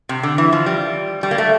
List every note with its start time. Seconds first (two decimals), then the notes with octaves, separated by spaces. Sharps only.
0.09 C3
0.23 D3
0.38 E3
0.52 F3
0.66 G3
1.23 G3
1.31 A#3
1.38 A3